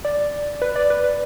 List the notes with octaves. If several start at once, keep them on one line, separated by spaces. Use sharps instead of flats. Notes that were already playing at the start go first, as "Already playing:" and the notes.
D5
B4
D5
B4
B4